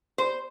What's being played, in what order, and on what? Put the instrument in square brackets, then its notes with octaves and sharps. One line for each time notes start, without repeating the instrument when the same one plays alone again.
[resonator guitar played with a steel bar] C5